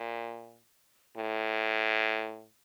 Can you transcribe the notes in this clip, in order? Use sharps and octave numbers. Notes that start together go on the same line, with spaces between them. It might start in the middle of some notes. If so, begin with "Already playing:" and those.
Already playing: A#2
A2